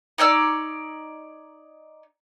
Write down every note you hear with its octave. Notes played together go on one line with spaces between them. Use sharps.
D#4 C#5 D5 E6